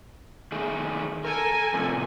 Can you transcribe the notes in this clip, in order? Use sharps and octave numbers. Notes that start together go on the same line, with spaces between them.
D#3 A3 G#4
A4 A#4 G#5
A2 C3 F3